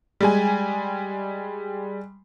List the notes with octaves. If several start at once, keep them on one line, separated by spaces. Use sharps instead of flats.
G3 G#3 G#5